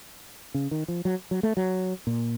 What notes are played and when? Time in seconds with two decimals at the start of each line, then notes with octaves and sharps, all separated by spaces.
0.54 C#3
0.71 D#3
0.88 F3
1.05 F#3
1.31 F#3
1.43 A3
1.57 F#3
2.07 A#2